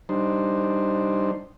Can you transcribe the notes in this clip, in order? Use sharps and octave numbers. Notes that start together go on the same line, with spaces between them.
G3 D4 D#4 C5